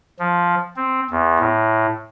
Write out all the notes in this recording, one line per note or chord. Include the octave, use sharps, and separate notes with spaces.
F3
C4
E2
A2